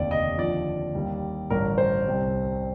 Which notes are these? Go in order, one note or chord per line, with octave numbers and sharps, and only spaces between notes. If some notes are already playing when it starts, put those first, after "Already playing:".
Already playing: F1 D#2 D3 D5
D#5
D#2 D3 F3 D5
D#2 D#3 G3
A1 G2 D3 A#4
C5
C2 C3 G3